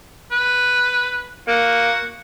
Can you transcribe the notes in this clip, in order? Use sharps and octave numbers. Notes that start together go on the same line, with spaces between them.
B4
A#3 F#4